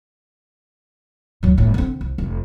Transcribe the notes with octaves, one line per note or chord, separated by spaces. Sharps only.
D2 F#3
G1 A2
D3 C4
C2
F1